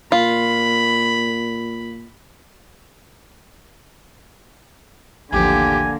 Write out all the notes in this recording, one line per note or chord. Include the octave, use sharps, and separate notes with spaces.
A#2 F4 B5
A1 D#2 D3 F3 A#3 G4 G#5